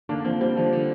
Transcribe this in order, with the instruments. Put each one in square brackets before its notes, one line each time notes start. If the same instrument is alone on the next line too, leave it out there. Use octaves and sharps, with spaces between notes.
[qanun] D3 [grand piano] A#3 D4
[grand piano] F3 A#3 [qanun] C4
[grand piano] G3 [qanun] C4
[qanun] D3 [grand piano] F3
[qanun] D3